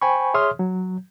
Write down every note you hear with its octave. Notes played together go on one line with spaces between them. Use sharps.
C5 G5 G#5 B5 C#6
G#4 C#5 E5 C6 D#6 F6
F#3